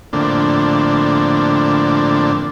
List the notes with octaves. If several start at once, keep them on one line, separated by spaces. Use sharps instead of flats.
F2 A2 D3 A#3 C4 D4